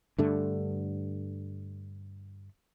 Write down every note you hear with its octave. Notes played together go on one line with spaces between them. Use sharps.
G2 D3 A3